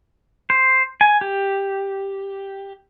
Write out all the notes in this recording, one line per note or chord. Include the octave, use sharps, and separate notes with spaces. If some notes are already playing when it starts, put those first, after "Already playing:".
C5
G#5
G4